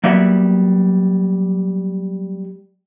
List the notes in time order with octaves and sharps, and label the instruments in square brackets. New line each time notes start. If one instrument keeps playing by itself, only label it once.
[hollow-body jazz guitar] F#3 G3 A#3 B3 D5 E5